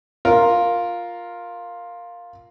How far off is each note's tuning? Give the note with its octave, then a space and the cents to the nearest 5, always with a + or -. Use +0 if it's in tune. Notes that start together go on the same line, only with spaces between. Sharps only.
F4 +5 A#4 +0